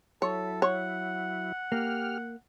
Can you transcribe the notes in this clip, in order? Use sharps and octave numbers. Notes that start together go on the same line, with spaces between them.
F#3 E4 A4 C#5
C#5 F#5
A#3 G4 F6